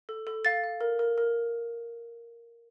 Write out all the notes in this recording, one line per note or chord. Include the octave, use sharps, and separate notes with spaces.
A4
A4
F5 A6
F5
A#4
A#4
A#4